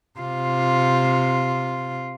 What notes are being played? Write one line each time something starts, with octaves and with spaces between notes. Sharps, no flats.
C3 F4